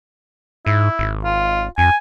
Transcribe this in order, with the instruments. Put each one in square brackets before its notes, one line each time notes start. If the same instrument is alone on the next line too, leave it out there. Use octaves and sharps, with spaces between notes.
[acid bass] G#2 [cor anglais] E4
[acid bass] G#1
[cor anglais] F4
[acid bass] F2 [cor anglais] G#5